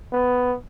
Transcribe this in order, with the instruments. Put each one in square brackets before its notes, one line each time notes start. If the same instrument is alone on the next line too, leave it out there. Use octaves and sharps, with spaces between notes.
[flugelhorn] B3